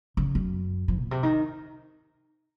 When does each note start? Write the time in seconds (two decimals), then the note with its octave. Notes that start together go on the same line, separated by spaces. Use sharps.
0.17 C#3
0.35 F#2
0.88 F3
1.00 A#2
1.11 C3
1.23 D#3